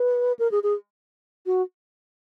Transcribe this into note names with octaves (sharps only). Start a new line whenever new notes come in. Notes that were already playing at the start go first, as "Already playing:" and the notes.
Already playing: B4
A#4
G#4
G#4
F#4